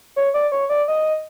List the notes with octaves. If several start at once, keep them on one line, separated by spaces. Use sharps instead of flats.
C#5
D5
C#5
D5
D#5